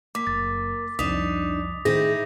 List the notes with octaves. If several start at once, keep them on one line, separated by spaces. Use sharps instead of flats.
A#3 D6 B6
F#1 A6
C2 F2 D4 D#4 D#6 B6 F7
A2 D#3 C4 D#4 E4 G#4 A#6